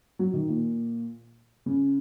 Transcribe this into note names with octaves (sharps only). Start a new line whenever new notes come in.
F#3
D#3
A#2
C#3